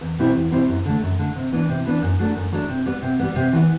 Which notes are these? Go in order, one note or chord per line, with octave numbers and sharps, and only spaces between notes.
E2
B2 G3 C4 E4
E2
B2 G3 C4 E4
F#2
D3 A3
F#2
D3 A3
C3
E3 B3 D4
C3
E3 B3 D4
F#2
F#3 A3 D4
F#2
F#3 A3 D4
C3
G3 B3
C3
G3 B3
C3
E3 B3